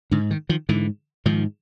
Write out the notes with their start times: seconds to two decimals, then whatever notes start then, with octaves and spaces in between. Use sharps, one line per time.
0.11 G#2 D3
0.31 D#3
0.49 D#3 F3
0.69 G#2 D3 E3
1.26 G#2 D#3 F3